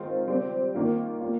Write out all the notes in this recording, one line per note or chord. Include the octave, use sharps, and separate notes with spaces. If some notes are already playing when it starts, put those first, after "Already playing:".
Already playing: D#3 G#3 C4 F4
G3 C4 G4
D#3 A#3 F4
A#3 F4